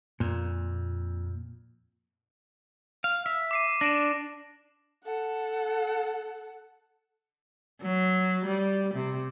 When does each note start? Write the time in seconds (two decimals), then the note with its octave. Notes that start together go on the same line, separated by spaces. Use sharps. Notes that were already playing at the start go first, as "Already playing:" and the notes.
0.20 F2 A#2
3.04 F5
3.26 E5
3.51 D6 C7 D#7
3.81 D4 A#6 D7 E7
5.03 A4 F#5
7.82 F#3
8.45 G3
8.94 C3